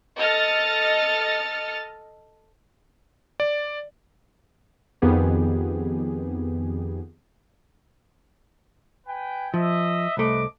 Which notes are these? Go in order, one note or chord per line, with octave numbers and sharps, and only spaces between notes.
A4 D#5 F6 A6 C#7
D5
F2 D#3 B3 G4 G#4
B4 G5 G#5
F3 D#5 E5
C2 A3 B4 D#5 D6